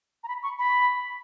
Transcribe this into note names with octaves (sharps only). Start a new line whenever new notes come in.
A#5
B5
C#6
B5